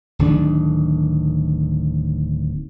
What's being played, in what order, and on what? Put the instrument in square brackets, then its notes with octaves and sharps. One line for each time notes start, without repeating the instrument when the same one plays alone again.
[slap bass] D1 D#3 D4